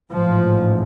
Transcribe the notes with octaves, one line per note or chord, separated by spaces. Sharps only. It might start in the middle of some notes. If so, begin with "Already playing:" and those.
A1 G#2 F3